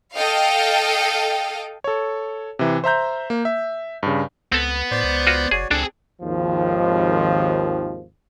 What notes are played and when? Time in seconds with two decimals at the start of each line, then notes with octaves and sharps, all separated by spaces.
0.16 A4 D#5 F5 G5
1.84 A4 C#5
2.59 C3 E3
2.84 C5 E5 A#5 G6
3.30 A#3
3.45 E5
4.03 G2 C#3
4.52 C#2 B3 C4 A4
4.91 A2 C5 D5 C6
5.04 C#2
5.27 F4 F#4
5.51 F#1 F#4 G#4 C#5 D5
5.71 C#2 C4 D4 G#4 A4
6.22 G#1 D#2 F3